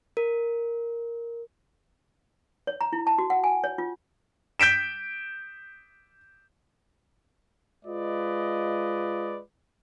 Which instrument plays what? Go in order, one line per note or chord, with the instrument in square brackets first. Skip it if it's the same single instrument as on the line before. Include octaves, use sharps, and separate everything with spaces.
[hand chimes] A#4
[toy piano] C#5
A#5
E4
A5
F#4
F#5
G#5
C#5
F4
[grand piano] G6 B6 D7 E7
[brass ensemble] G#3 F4 B4 D5 D#5